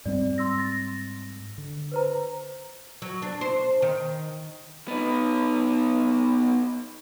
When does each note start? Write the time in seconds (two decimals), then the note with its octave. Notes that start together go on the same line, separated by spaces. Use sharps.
0.05 G#2 G3 C4 D5
0.38 C6 E6 A#6
0.58 A6 A#6
1.58 D3
1.92 B4 C5 A#5
3.02 F#3
3.22 D4
3.41 C5
3.82 D#3
4.88 B3 D#4